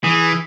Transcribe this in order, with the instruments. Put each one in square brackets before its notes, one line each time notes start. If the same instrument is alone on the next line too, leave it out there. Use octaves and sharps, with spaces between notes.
[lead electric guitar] E3 [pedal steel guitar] G#4